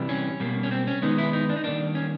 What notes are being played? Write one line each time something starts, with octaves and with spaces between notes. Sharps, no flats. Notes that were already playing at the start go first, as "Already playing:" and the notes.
Already playing: C3 E3 G3
C#4
B2 G3 A#3
C#4
C4
C#4
D#3 G#3 B3 D#4
E4
D#4
D4
D#4
D#3 G3 A#3 D4
C#4